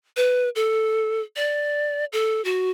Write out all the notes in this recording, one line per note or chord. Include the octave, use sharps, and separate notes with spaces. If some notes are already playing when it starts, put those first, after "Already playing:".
B4
A4
D5
A4
F#4